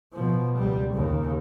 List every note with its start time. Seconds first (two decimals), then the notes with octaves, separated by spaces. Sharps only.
0.13 B2 F3
0.58 C#2 G3
0.94 D#2 C#3